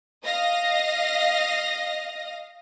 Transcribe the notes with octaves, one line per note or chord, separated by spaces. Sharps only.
D#5 F5 A#6